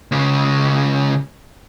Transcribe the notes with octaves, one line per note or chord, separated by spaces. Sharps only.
C#2 C#3